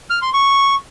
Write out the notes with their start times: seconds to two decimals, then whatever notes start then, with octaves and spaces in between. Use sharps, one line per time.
0.10 F6
0.22 C6
0.34 C#6